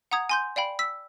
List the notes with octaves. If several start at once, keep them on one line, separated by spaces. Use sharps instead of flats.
F#5 A#5 D#6 G#6
G#5 C6 G6
D5 F5 G5 B5
E6 B6